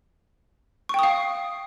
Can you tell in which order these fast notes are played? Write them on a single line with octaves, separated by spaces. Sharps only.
C#6 G5 D#6 F5